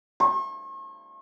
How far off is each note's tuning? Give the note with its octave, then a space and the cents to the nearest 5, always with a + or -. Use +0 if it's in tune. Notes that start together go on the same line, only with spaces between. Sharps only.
C#6 -45